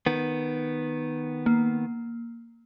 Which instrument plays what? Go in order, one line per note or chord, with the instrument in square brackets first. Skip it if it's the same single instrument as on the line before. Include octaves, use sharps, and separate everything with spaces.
[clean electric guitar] D#3 B3
[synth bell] A#3